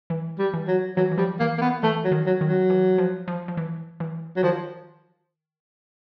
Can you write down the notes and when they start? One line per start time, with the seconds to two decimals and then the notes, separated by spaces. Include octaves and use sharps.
0.10 E3
0.39 G3
0.54 E3
0.68 F#3
0.96 E3 F#3
1.11 E3
1.18 F3 G3
1.39 E3 A#3
1.58 A#3
1.61 E3 B3
1.83 E3 A3
2.05 F#3
2.12 D#3
2.26 F#3
2.41 D#3
2.48 F#3
2.70 E3
2.98 F3
3.28 F3
3.48 F3
3.57 E3
4.00 E3
4.36 F#3
4.43 D#3 F3